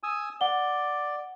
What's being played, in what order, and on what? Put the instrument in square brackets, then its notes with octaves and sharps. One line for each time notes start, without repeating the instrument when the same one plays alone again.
[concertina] G#5 D#6 E6
[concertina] D5 [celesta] F#5 G7